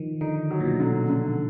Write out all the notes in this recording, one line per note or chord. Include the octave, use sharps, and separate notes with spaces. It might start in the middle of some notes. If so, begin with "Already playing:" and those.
Already playing: D#3 F3
D3 D#4
F#3
A#2
B2
D3
D3